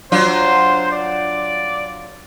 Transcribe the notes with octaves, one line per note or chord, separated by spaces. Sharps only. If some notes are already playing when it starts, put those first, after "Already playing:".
F#3 D4 F4 C5
D5